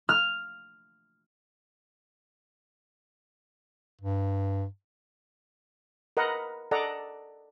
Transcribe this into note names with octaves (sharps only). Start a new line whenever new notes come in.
F6
G2
A#4 B4 D#5 F#5
A4 D5 D#5 F#5 A#5